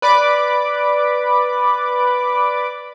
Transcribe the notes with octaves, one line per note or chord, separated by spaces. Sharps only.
B4 D5 B5 D6